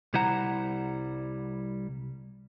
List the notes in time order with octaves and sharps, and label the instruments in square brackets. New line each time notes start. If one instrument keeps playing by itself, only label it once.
[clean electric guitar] C2 G3 E4 C5 F#5 A#5